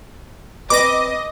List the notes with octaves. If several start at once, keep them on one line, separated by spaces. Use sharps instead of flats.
C4 B4 D#5 D6 A#6